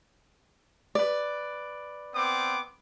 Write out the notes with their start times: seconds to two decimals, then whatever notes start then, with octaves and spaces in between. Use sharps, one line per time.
0.95 B4 D5
2.14 B3 C4 D6